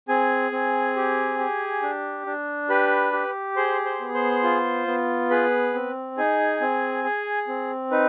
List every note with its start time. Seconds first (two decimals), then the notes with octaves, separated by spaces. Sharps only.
0.08 C4 G#4 G#5
0.52 C4
0.96 G4
1.39 G4
1.82 D4
2.26 D4
2.69 G4 B4 B5
3.13 G4
3.56 G#4 C5 C6
3.85 C5 C6
4.01 B3
4.14 C5 C6
4.43 F4
4.87 B3
5.30 G#4 B4 B5
5.74 C4
6.17 D#4 G#4 G#5
6.61 C4
7.04 G#4
7.48 C4
7.91 D#4 B4